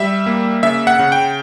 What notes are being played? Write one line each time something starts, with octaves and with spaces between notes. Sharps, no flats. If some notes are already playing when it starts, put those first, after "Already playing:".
Already playing: G3 E5
A#3
C#3 E5
F#5
C#3
G5